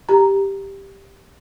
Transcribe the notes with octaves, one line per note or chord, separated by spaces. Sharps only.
G4 A#5